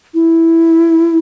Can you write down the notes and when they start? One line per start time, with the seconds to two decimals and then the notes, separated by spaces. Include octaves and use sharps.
0.14 E4